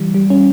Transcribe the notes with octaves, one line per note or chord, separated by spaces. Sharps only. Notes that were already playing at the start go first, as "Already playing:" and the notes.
Already playing: E3 G3
G3
C#4